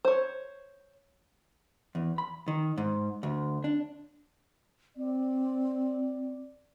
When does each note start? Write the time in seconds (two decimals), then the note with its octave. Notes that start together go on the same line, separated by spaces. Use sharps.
0.05 C5 C#5
1.95 E2
2.18 B5
2.48 D#3
2.77 G#2
3.23 D2
3.64 D4
4.97 C4 D5